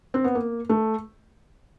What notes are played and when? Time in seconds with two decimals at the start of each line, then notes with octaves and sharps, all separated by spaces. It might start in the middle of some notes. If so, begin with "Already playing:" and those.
0.14 C4
0.24 B3
0.35 A#3
0.69 A3